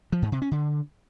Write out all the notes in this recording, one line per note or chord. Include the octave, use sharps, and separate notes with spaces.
F3
G#2
C3
C#4
D3